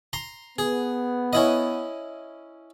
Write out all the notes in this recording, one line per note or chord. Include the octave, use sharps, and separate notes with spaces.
A#5 C6
B3 G#4
C#4 E4 D#5